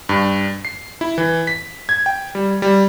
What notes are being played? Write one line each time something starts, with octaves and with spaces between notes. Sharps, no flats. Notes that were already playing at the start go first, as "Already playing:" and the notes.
G2
C7
E4
E3
B6
G#6
G5
G3
G3